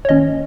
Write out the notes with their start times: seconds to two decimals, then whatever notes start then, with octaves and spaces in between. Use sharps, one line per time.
0.05 C#5
0.09 D#3 A#3 C#4 D#5